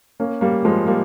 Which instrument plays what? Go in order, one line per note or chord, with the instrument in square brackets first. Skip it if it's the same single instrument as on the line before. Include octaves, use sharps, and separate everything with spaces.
[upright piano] A#3 C#4
G3 A#3
F3 G#3
G3 A#3